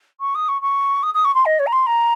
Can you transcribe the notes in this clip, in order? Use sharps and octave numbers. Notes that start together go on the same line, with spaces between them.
C#6
D#6
C#6
C#6
D#6
D#6
C#6
C6
D#5
C#5
A#5
C6
A#5